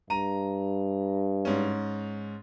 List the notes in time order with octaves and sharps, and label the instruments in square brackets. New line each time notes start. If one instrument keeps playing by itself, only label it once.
[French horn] G2 [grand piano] A#5 D#7
[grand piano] G#2 C#4